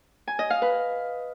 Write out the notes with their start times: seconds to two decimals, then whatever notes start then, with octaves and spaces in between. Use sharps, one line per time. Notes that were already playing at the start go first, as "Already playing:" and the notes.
0.28 G#5
0.39 D#5
0.50 F5
0.62 B4